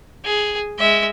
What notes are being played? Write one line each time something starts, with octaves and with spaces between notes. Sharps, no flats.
G#4
G#3 E5